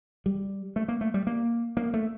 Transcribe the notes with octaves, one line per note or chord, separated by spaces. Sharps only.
G3
A3
A#3
A3
G3
A#3
A#3
A3